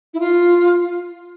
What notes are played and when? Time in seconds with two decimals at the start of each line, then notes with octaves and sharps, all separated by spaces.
0.13 E4
0.19 F4